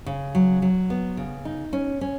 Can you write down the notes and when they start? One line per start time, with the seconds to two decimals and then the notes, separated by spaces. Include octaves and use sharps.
0.06 C#3
0.35 F#3
0.62 F#3
0.90 B3
1.17 C#3
1.45 D#4
1.73 C#4
2.01 C#4